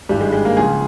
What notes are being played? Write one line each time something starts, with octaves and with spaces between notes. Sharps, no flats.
G#1 G2 E3 G3
G#3
G#3
A#3
C#2 C#3 F3 G#4